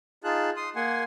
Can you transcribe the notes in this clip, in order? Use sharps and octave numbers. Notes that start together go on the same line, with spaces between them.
D#4 F4 G#4 A5 F#6
C6 D#6
A#3 F#5 G#5 C6